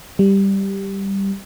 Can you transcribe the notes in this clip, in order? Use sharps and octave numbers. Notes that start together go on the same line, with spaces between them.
G3